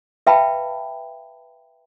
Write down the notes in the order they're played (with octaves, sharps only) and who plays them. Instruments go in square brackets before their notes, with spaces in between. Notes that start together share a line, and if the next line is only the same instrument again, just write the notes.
[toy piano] B4 E5 F5 G5 A5 B5